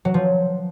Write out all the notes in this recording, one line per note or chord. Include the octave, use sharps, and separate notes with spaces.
F#3
F3